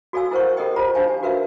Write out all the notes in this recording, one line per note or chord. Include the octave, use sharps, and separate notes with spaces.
F#4 A4 D5 F5 G#5 E6
E4 A#4 C5 F#5 C#6
G4 A4 A#4 D#5 G5
F4 C5 A#5
D4 D#4 G4 C5 F5 G#5
F#4 A#4 B4 E5 F5